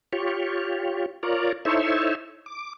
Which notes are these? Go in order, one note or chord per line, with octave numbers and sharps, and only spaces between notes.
F4 G4 C#5
F4 A#4 C#5 D5
D#4 E4 A4 C5 C#5 E5
D6